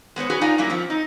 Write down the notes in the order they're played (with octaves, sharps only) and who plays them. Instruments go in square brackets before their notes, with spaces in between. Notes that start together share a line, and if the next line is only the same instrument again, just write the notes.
[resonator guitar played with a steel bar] G#3 B3 C5 C#5
C#4 F#4 G#4 B4
D#4 F4 D5 F5 G#5
G2 F#3 A#3 C#4 E4
F3 C4 C#4
D#4